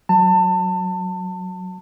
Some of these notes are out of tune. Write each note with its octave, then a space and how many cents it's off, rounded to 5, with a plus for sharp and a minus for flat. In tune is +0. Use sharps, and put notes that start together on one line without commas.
F#3 +0 A5 +25